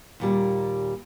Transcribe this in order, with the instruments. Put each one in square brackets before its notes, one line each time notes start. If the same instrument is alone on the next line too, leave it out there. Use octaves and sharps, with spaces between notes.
[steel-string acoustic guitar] D#2 A#2 G3